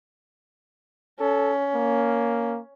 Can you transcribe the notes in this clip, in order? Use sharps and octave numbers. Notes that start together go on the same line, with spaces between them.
C#4 A4
A#3